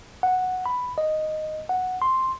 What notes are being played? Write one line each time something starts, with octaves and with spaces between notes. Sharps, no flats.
F#5
B5
D#5
F#5
C6